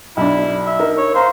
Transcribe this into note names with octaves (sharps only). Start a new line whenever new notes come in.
B1 D4 E4
E5
D#4 A#4
C#5
C5 F5 A#5 C6